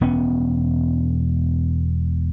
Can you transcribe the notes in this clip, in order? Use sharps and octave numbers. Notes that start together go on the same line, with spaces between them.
E1 B3 C#4